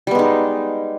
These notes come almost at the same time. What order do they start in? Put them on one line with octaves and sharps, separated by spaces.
G3 B3 G#3 D#4